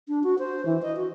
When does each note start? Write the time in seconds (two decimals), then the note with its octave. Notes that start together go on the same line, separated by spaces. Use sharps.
0.08 D4
0.23 F#4
0.39 C5
0.66 E3
0.82 D#5
0.96 F#4